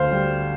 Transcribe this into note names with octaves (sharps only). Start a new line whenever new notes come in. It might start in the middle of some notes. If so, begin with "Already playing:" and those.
Already playing: D2 C5 F5
G3